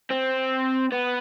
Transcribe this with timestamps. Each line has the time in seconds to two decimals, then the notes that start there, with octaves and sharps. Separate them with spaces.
0.10 C4
0.92 B3